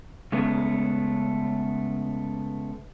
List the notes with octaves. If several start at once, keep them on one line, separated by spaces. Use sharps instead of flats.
C#3 G#3 A3 B3